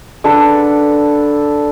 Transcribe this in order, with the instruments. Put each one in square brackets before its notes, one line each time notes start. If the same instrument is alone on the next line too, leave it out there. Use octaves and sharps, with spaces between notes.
[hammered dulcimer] D3 A4 B4